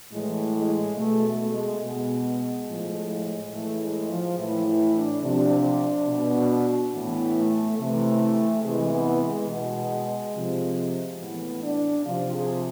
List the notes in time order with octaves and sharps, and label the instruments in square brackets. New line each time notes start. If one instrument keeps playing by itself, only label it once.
[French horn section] A2 E3 G#3
G#3
B2 A3
A3
G#3
B2 G#3
A2 F3
A2 E3 A3
G#3
F3
A2 E3 E4
E4
D4
C3 F3 D4
B2
A2 E3 B3
A3
C3 E3 A3
C3 E3 G#3
B3
G#3
B2 G#3
C3 F3
A2 E3 B3
D4
C3 F3 F4
G#4